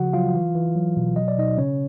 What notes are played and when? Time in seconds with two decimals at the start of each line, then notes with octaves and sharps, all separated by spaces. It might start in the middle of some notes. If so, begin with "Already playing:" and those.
Already playing: C#3 F3 F#4 F#5
0.13 F#3 F4 F5
0.34 E3
0.55 E3
0.75 F#3
0.97 B2
1.16 F#3 D#5
1.28 D5
1.38 B2 D#4 D#5
1.58 C#3 C#4 C#5